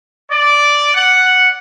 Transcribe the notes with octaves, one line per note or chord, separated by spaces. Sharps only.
D5
F#5